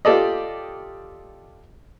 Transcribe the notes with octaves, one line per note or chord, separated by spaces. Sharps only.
F4 G4 A4 D5 D#5